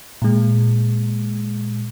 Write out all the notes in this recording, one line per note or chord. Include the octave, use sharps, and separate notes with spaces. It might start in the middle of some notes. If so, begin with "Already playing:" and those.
A#2 G#3